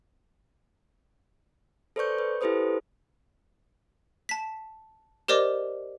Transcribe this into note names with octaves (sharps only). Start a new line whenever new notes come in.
A4 B4 C5 D5 C#6 G6
B4
E4 G4 A4 B4 C5 D#6
A5 B6
G4 A#4 C5 D5 D#5 D6